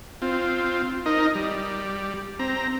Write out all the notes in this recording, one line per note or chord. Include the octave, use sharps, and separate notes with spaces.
C4 F4
D#4 A#4 D#5
G3
C4 A#5